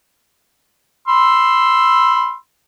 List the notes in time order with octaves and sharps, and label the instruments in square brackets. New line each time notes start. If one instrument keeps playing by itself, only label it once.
[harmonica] B5 C6 E6